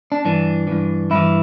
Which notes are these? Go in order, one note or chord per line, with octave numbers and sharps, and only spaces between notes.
D4
G2 E3 D4
G2 E3
G2 E3 E4